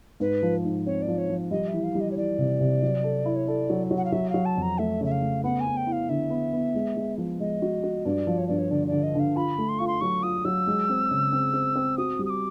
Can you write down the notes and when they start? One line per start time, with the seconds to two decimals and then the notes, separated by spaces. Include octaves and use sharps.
0.20 G#2 B4
0.43 F3
0.65 G#2
0.86 C4 C#5
1.02 D5
1.08 F3
1.18 C#5
1.30 F3
1.51 G3 D#5
1.68 E5
1.74 E3
1.83 F5
1.95 G3
2.01 D#5
2.11 C#5
2.17 E3 D5
2.38 C3
2.60 C3
2.83 F#3
3.04 A4
3.25 E4
3.36 C#5
3.48 A4 D5
3.70 F#3
3.91 F#3
3.98 F#5
4.05 F5
4.12 F#3 E5
4.30 F#3 F5
4.45 A5
4.57 F2
4.62 A#5
4.79 A3 E5
5.01 C#3 E5
5.12 F5
5.22 A3
5.44 B3 F#5
5.60 G#5
5.66 B3
5.77 G5
5.87 E4
5.92 F5
6.09 D3 E5
6.30 B3
6.53 B3
6.75 G#3
6.97 G#3
7.18 F3
7.40 G#3 D#5
7.62 F#4
7.83 F#4
8.05 G2 D5
8.27 F3
8.38 C#5
8.48 G2 D5
8.59 C#5
8.71 D3 D5
8.87 D3 D5
9.03 D#5
9.15 D3 F5
9.35 F4 B5
9.58 A3
9.69 C6
9.79 F4 C#6
9.87 C6
10.01 F#3 C#6
10.23 F4 D#6
10.45 F#3 E6
10.67 G#3
10.89 C4
11.11 C#3
11.33 C4
11.54 C4
11.76 C4
11.98 F#4 D#6
12.19 G3
12.26 D#6
12.30 D6